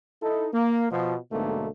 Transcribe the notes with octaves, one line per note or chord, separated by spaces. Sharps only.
D#4 E4 A4
A#3
B2 F3
B1 G#2 B2 D3 A3 A#3